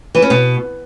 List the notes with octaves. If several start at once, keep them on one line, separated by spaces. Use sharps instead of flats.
E3
C#4
B2